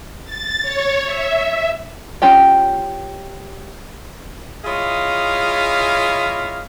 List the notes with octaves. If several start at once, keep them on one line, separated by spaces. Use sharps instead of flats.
A6
C#5
E5
C#4 F4 G4 G5
E4 F4 G#4 C#5 D#5 F5